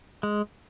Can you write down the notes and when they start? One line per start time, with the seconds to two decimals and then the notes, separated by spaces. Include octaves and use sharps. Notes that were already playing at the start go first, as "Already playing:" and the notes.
0.23 G#3